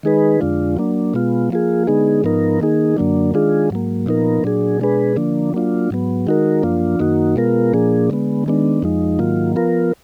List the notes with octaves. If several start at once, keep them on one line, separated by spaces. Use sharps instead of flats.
D#3 G#3 D#4 G#4 B4
F2 D3 G#3 D4 F4
F#3 A#3 D4
B2 G#3 B3 F4
F3 A#3 F4 G#4
D3 G#3 B3 D#4 G#4
G#2 F3 B3 D#4 A#4
D#3 A#3 D#4 G#4
F#2 D3 F#3 A#3 D4
D#3 G#3 D4 F4 G#4
G#2 F#3 A#3
A#2 F3 B3 D#4 A#4
A#2 F#3 D4 G#4
B2 G#3 D4 G#4 B4
D3 F3 A#3 D4
F#3 A#3 D4 F4
G#2 F#3 B3
D#3 G#3 D#4 F#4 A#4
F#2 F3 A#3 D4 F4
F#2 D#3 A#3 D#4 F#4
B2 G#3 B3 F4 A#4
A#2 F3 A#3 D4 G#4
D3 G#3 B3
D#3 G#3 B3 D4
F2 F3 G#3 D#4
G#2 D#3 F#3 A#3 F4
F3 B3 F4 A#4